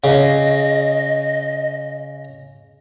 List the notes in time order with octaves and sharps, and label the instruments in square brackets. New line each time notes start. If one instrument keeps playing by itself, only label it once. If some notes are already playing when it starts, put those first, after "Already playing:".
[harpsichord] C#3 [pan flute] D#5